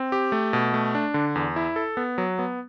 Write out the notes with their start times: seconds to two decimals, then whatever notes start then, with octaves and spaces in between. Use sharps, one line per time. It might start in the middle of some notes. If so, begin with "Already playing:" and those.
Already playing: C4
0.12 G4
0.32 A3
0.53 B2
0.74 A3
0.95 D4
1.14 D3
1.35 E2
1.56 E4
1.76 A4
1.97 B3
2.18 F#3
2.39 B3